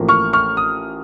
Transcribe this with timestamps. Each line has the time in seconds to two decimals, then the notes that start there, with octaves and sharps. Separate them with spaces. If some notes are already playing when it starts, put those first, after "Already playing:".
Already playing: A1 A2 F3 A#3
0.09 C#6 F6
0.33 C#6 F6
0.57 D#6